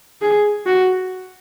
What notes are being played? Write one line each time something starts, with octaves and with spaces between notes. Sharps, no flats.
G#4
F#4